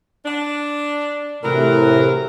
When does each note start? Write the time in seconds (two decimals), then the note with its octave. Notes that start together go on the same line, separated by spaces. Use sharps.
0.25 D4
1.43 A2 C3 E3 F#3 A#4